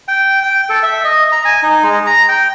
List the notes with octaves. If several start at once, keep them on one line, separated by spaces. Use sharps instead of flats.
G5
G5
A4
E5
D#5
A#5
G#5
D#4
G#3
A#5
G5